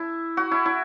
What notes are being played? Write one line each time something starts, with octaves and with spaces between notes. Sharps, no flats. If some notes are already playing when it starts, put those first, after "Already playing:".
Already playing: E4
F#4
E4
E4